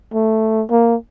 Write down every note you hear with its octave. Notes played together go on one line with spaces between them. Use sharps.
A3
A#3